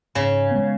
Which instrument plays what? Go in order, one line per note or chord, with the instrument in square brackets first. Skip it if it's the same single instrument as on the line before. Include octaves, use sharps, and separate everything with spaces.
[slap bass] G#2 [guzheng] C#3
[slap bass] G#3 B3